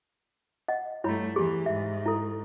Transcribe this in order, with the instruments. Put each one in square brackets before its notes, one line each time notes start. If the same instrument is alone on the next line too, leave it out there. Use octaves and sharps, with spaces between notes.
[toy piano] D#5 F#5
[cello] G2 A3 [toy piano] E4 C#5 B5
[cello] E2 E3 [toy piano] G4 G#4
[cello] G#2 [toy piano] E5
[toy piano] E4 A4